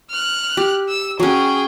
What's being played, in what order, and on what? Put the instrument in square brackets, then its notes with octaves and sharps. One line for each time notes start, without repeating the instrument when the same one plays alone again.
[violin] F6 F#6
[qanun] G4
[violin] E6
[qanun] F#3 C#4 [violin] G#4 G5